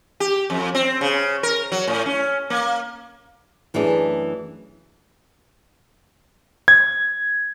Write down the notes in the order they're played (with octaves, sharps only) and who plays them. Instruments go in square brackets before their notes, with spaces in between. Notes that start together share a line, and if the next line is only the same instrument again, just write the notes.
[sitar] G4
F2
C4
C#3
A#4
F#3
A2
C#4
A#3
[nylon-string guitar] F#2 E3 A3 D4 G#4
[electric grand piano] G#6